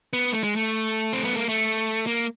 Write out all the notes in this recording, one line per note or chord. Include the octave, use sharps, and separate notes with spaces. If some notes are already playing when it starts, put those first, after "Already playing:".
B3
A3
G#3
A3
C4
B3
A#3
A3
A#3